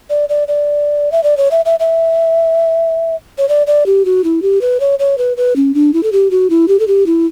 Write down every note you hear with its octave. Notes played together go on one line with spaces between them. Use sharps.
D5
D5
D5
E5
D5
C#5
E5
E5
E5
C#5
D5
D5
G4
F#4
E4
G4
B4
C#5
C#5
B4
B4
C#4
D4
E4
A4
G4
F#4
E4
G4
A4
G4
E4